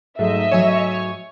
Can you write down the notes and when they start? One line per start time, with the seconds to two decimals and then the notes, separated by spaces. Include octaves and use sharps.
0.19 G#2 F#3 A3 D#5 E5
0.51 G#2 F#3 C#5 G#5 C#6